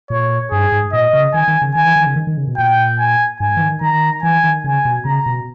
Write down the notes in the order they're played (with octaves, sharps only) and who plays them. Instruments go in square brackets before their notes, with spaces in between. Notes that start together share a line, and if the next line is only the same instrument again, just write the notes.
[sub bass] A#2 [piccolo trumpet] C#5
[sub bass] G2 [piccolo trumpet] G#4
[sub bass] G#2
[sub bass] A#2 [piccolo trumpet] D#5
[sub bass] C#3
[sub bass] D#3 [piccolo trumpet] G#5
[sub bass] D#3
C#3
[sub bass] D#3 [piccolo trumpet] G#5
[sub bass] E3
D#3
C#3
D#3
D#3
C#3
B2
[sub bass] A#2 [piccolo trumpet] G5
[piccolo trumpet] G#5
[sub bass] G#2 [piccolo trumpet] G#5
[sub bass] E3
D#3
[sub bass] D#3 [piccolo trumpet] A#5
[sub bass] E3 [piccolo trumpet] G#5
[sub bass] D#3
[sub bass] C#3 [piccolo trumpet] G#5
[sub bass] B2
[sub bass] C#3 [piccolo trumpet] A#5
[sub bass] B2